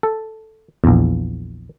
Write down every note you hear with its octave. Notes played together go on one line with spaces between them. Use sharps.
A4
A#1 E2